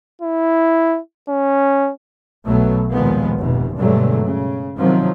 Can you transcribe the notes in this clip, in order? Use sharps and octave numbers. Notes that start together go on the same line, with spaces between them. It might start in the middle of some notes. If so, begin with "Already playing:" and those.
E4
C#4
B1 B2 F#3 A3 B3
D#2 A#2 D#3 F3 G#3 B3
F1 G#2 B2
G2 B2 D3 F#3 G#3 A3
C#3
C3 D#3 F3 F#3 C4